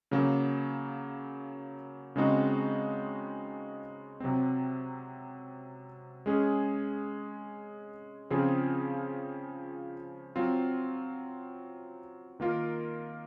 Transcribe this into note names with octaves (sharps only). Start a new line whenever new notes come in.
C#3 F#3 A#3
C#3 G#3 C4 D#4 F#4
C3 F#3 C4
G#3 C#4 G#4
C#3 F3 C4 F4 G#4
F#3 C4 F4
D#3 A#3 F4 A#4